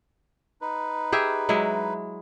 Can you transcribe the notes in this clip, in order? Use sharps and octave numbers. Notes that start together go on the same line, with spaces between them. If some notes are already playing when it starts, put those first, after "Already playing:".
D#4 B4
G4 G#4 E5
F#3 G#3 E4